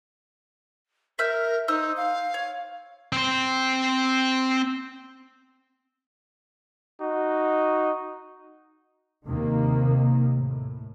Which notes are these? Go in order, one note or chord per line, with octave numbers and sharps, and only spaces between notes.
A#4 E5 F6 G6
D#4 C5 E6
F5
C#5
C4 C5
D#4 F#4
D#2 C3 D#3 A#3
A2